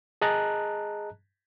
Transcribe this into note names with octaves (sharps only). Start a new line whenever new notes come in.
G#4 D#5 A5 A#5 F#6